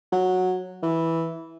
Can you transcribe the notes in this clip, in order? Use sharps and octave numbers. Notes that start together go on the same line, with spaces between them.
F#3
E3